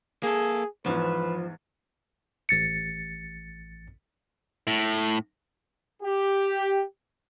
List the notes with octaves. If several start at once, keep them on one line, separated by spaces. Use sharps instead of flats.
A#3 G#4 A4
E2 G#2 F3 B4
A1 A6 C#7
A2
G4